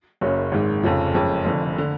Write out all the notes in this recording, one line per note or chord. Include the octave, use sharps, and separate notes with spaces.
F#1 F#2 C#3 F#3 C#4
G#1 G#2 G#3
F1 F2 C#3 F3
F#1 F2 C#3 G#3
F1 F2 D3
D3